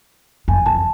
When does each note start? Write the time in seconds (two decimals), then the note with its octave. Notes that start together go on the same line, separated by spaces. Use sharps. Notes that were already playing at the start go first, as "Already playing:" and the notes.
0.48 F#2 G#5
0.66 F2 A5